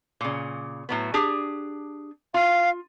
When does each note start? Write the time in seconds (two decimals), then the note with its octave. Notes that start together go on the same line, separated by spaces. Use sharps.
0.21 A#2 C#3
0.89 A2 F#3 B3
1.14 D4 G4 G#4
2.34 F4 F5